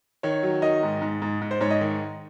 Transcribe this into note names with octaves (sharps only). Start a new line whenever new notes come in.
D#3 C#5
F#3
D#3 D#5
G#2
G#2
G#2
G#2
C5
G#2 C#5
D#5
D#3